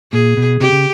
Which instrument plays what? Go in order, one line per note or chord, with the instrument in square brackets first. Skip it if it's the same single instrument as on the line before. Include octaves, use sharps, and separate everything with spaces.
[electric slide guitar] A#2 [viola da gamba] G#4
[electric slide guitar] B2
[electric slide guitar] C3 [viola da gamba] G4
[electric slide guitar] C#3